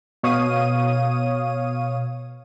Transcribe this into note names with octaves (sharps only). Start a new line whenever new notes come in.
B2 C#5 F5 D#6 D#7